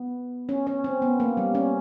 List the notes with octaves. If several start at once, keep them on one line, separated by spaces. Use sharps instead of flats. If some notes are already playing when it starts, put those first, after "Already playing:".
Already playing: B3
C#4
C#4
C4
B3
A#3
G3
C#4